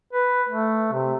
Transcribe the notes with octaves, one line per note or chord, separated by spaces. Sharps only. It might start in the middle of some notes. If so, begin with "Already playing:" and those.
B4
A3
C3